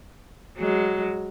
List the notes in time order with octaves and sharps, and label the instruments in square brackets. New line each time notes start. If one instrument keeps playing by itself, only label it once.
[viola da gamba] F#3 G#3